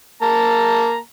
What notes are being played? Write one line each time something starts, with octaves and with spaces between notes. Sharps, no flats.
A#3 A5 A#5